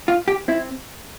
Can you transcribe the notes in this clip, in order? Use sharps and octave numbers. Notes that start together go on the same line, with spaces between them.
F4
G4
C4 E4